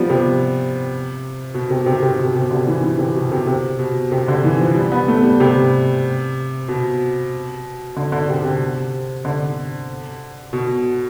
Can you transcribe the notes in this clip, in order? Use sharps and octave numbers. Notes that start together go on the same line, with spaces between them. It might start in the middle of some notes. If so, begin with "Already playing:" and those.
Already playing: F3 G3 B3
C3
B2
C3
C3
C3
B2
C3
D3
E3
E3
C3
B2
C3
C3
B2
C3
D3
E3
F3
G3
B3
A3
G3
C3
B2
D3
D3
C3
C3
D3
B2